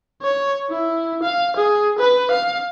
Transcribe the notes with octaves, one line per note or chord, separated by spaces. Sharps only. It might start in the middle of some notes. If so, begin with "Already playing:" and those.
C#5
E4
F5
G#4
B4
F5